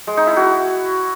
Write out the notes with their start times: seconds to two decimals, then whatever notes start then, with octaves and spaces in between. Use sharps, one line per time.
0.07 G#3
0.17 D#4
0.27 E4
0.36 F#4